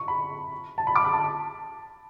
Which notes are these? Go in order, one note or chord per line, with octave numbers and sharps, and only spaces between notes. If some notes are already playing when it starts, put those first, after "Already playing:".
Already playing: C#6
B5
A5
B5
D6
B5
A5